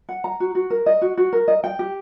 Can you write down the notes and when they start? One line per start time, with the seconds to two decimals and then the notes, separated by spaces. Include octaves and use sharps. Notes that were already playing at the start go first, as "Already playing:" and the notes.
0.09 F#5
0.24 A#5
0.40 F#4
0.55 F#4
0.70 A#4
0.86 D#5
1.02 F#4
1.17 F#4
1.33 A#4
1.48 D#5
1.64 G5
1.79 G4